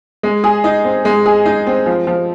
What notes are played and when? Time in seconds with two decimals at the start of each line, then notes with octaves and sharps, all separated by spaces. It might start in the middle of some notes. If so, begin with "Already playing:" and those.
0.23 G#3
0.44 G#4
0.64 D#4
0.84 C4
1.05 G#3
1.26 G#4
1.46 D#4
1.67 C4
1.86 F3
2.07 F3